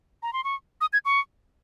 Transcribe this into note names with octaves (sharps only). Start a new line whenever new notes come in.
A#5
C6
C#6
D#6
G#6
C#6